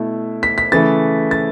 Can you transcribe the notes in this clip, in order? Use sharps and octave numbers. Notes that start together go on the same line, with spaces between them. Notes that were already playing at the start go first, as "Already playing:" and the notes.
Already playing: B2 A3 E4
B6
B6
C#3 E3 A3 E4 A6
A6